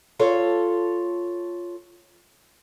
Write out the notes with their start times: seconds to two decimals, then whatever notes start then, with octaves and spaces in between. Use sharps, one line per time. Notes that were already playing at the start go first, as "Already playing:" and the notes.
0.19 F4 A4 C#5